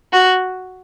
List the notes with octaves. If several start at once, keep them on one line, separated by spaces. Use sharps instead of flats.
F#4